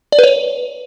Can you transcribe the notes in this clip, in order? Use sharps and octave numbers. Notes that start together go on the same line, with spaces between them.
D5
B4
C#5